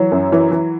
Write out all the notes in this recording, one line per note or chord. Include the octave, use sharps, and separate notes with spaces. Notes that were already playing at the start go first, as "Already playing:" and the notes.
Already playing: E3 F#3
F#2
E3
E3